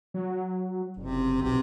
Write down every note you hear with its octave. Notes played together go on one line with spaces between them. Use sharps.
F#3
F#1 C3
B1 C3